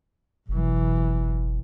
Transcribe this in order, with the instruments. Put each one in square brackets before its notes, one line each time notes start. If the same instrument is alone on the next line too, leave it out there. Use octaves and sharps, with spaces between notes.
[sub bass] F#1 [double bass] B1 E3